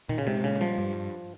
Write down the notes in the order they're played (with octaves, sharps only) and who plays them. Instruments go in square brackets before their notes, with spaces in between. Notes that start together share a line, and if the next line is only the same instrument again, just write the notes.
[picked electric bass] A#2 [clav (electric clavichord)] D#3
[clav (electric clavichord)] C#3
[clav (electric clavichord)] C3 [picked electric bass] G#3
[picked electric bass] A#2 [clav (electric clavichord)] C#3
[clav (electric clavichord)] F3 [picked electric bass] G3
[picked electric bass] G2